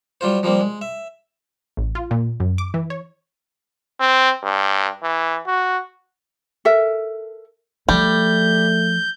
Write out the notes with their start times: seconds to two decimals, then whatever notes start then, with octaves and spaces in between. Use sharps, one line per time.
0.21 F#3 G3 F4 C5
0.43 F3 G3 A#3 C4
0.61 G#3
0.81 E5
1.77 A1
1.95 F4
2.11 A#2
2.40 F#2
2.58 D6
2.74 E3
2.90 C#5
4.00 C4
4.43 G2
5.03 E3
5.47 F#4
6.65 A4 A#4 E5
7.89 F3 G3 A3 G6